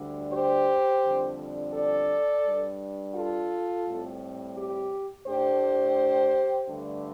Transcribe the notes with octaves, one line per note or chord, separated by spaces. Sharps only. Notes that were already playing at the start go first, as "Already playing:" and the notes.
Already playing: D2 D3 G3 D4
G4 C5
F2 D3 G3 D4
A4 D5
G2 G3 D4
F4 A4
A2 G3 C4
G4
A2 A3 D4 G4 C5
G2 D3 A3 D4